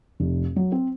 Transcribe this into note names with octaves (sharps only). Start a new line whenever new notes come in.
F1
F#3
C4